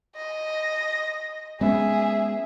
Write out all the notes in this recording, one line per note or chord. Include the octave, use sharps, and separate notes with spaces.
D#5
G#3 B3 C#4 G#4 E5